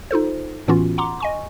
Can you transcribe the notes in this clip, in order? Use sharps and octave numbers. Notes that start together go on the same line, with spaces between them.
D#4 F4 A4 C5
A2 E3 B3 C#4 F4 F#4
F#5 A#5 C6 D6
D#5 G#5 C#6